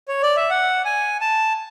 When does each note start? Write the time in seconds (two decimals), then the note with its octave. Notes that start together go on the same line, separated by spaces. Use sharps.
0.08 C#5
0.22 D5
0.36 E5
0.50 F#5
0.85 G#5
1.21 A5